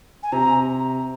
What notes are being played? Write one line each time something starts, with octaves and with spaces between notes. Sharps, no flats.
G#5
C3 A#5